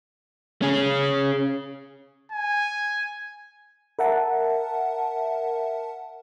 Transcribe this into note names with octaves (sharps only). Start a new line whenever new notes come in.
C#4 G#4
G#5
A#4 E5 F#5 A5